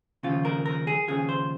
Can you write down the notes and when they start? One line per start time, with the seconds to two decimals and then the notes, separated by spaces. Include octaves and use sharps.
0.23 D#2 C#3 F3 F4
0.45 A#4
0.66 A#4
0.87 G#4
1.08 D#2 C#3 F3 G#4
1.29 C5